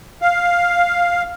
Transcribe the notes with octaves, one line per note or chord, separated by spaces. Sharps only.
F5